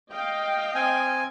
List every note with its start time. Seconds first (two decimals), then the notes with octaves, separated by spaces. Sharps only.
0.10 D#5 F5 G5
0.75 C4 G#5